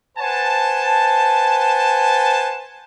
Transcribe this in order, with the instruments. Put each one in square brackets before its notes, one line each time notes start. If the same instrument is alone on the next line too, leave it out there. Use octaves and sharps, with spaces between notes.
[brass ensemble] B4 C5 F#5 G#5 A5